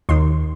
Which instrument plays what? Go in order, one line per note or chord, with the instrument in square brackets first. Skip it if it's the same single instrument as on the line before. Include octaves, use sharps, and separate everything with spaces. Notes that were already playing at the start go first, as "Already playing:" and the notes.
[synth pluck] D#2 D#3 C6